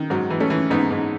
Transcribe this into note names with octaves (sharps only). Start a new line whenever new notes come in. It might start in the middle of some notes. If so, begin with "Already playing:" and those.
Already playing: D#3
G#2 F#3
E3
A3 C#4
E3
G#2 B3 D#4
G#2